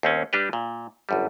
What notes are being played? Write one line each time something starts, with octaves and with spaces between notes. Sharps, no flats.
D#2 C4 C#4
G3 D4 G4 B4
A#2
G1 F#2 G3